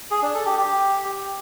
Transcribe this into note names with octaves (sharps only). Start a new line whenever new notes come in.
G#4
D4
A4
G4
G4